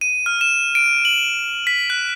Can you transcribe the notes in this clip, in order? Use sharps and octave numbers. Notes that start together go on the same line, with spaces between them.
D#7
F6
E7
D7
F#7
B6
F#6